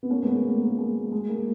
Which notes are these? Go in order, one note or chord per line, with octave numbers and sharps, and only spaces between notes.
B3
A#3 C#4
G#3 B3
A#3
A#3
A#3
G#3
G#3
A#3